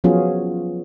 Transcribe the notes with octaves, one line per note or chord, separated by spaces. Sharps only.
F3 F#3 B3 C#4 F4 G#4